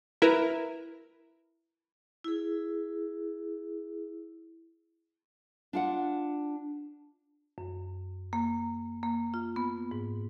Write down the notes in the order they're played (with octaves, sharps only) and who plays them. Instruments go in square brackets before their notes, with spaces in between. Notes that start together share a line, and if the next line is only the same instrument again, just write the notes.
[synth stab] E4 A#4 B4
[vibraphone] E4 G#4
[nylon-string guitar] D4 F4 F#5
[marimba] F#2
A#3
A#3
F4
B3
G#2